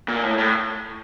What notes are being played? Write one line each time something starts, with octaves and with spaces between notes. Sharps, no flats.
A#2
A2
A2